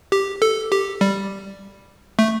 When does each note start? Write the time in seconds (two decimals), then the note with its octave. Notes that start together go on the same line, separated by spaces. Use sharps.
0.12 G4
0.42 A4
0.72 G4
1.01 G3
2.19 A3